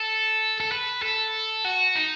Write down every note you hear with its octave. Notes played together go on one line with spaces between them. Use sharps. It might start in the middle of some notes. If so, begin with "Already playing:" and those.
Already playing: A4
A4
B4
A4
F#4
D#4